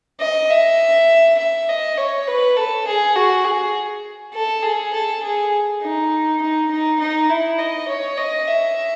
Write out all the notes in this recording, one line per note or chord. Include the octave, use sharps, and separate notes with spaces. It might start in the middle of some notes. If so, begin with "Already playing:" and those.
D#5
E5
E5
D#5
C#5
B4
A4
G#4
F#4
G#4
A4
G#4
A4
G#4
D#4
D#4
D#4
D#4
E4
D#5
C#5
D#5
E5